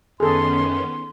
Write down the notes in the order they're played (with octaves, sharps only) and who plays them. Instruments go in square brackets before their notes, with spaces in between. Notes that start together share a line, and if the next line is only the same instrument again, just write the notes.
[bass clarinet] F#2 [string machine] D#3 B3 C#4 [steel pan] G#4 A4 [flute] C6